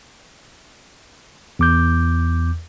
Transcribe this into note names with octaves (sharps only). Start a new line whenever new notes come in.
E2 D6 G6